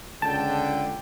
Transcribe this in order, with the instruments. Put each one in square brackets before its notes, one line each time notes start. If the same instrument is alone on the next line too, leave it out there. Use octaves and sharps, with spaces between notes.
[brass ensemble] C#2 D3 G5 [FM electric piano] A5